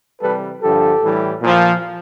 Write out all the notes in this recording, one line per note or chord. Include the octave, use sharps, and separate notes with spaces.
C3 E3 G3 A4 B4
G2 D3 F3 G4 A4
A2 E3 G3
A#2 F3